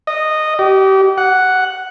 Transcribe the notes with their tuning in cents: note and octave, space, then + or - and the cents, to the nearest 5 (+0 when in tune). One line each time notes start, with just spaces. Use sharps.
D#5 -10
G4 -30
F#5 +0